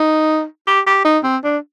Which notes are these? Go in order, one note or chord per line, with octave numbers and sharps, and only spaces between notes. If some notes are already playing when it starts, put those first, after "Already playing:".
Already playing: D#4
G4
G4
D#4
C4
D4